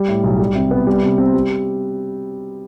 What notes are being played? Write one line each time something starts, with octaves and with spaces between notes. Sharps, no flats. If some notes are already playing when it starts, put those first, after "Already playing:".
Already playing: G3
A2
B1
G3
C3
B3
G3
C3
C4
G3